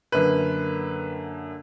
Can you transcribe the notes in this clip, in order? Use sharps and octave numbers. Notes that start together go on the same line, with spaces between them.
F#2 D3 A#3 B4